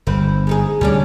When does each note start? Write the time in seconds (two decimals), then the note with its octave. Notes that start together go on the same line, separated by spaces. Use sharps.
0.07 G1 C4 B4
0.47 G#3 D#4 G#4
0.81 D2 C3 G3 C#4 D4 D5